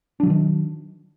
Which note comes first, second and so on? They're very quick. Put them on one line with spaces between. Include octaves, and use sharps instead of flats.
D4 F#3 D3 D#3